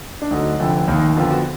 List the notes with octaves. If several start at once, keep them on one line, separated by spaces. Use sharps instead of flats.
D4
D2 D3 F#3 D#4
F1 F2 D3
F1 D#2 D#3 A#3
F2 D3 F3 B3 F4
F#4